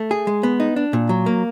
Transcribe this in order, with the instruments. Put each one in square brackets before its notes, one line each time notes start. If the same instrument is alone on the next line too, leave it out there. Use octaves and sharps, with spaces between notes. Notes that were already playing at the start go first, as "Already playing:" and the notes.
Already playing: [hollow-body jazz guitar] A3
G#4
G#3
B3
D#4
D4
A#2
F#3
A#3